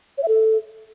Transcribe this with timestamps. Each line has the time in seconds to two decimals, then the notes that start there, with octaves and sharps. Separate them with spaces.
0.18 C#5
0.23 E5
0.28 A4